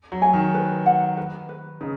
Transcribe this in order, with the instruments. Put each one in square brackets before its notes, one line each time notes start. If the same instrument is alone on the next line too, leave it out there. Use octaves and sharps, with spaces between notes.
[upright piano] F#3
[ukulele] G#5
[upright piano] D#3
[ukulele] B4
F#5
B4
B4
[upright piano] C#3 [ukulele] D#4